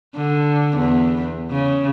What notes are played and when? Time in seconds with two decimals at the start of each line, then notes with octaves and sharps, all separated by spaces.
0.16 D3
0.77 E2
1.51 C#3